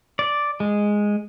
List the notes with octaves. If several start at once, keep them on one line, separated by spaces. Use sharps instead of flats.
D5
G#3